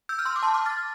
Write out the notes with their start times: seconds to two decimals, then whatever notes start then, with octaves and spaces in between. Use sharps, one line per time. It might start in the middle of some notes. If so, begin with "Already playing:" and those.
0.09 E6 G6
0.19 F6
0.25 C6 E6
0.36 D6
0.43 A5 C6
0.54 D6 F6
0.66 F6 A6